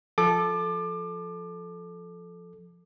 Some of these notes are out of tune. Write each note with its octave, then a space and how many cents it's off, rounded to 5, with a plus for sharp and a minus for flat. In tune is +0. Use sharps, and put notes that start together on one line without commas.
F3 +0 A4 -10 D6 +25